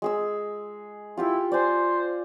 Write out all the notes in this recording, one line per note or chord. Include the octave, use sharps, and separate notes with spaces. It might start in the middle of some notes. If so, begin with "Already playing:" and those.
G#3 G#4 E6
E4 F4 G4 G5
C5 D5 G#5